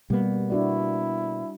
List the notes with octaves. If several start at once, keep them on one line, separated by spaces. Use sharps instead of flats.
B2 G3 A#3 B3
D4 E4 F#4 D5